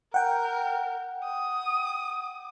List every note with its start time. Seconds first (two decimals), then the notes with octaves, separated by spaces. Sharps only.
0.14 A#4 F#5 G5
1.24 D#6